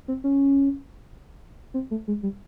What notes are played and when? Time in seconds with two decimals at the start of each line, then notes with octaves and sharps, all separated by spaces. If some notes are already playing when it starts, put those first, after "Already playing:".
0.08 C4
0.24 C#4
1.74 C4
1.91 A3
2.08 G#3
2.23 G3